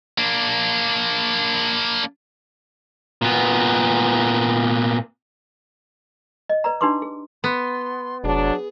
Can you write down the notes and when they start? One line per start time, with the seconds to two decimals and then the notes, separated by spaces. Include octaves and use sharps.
0.18 A#3 D4
3.22 A#2 B3
6.49 D#5
6.64 B4 D5 A#5
6.81 D4 D#4 G4 B4 C6 D6
7.02 G#4
7.44 B3 C6
8.24 F1 F#3 D4 G#4